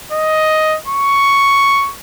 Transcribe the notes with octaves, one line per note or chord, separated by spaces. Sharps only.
D#5
C#6